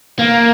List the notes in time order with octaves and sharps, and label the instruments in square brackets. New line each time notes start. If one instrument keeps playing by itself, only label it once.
[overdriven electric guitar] A#3